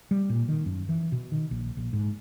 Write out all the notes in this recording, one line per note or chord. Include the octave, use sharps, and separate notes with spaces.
G3
A#2
D#3
F#2
E3
B2
D#3
A#1
A#1
G#2